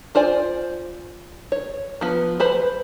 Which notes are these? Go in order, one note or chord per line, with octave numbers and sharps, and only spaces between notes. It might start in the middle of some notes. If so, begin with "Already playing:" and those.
F4 C5 D5 G#5
C#5
F3 B3
B4 C5 B5